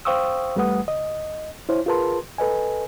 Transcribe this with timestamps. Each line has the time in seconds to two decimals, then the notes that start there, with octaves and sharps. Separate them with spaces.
0.05 C5 F5 G5 C#6 D#6 E6
0.56 E2 G3 A3 B4 F#5 D#6
0.87 C#2 D#5
1.69 E4 C5 C#5
1.86 F4 G#4 A#4 B4 A5 C6
2.38 A4 B4 D#5 G#5